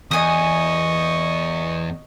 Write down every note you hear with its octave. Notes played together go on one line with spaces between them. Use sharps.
E2 D#5 G#5 C#6 D#6